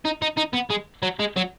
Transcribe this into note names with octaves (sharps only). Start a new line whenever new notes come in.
D#4
D#4
D#4
B3
G#3
F#3
G#3
F#3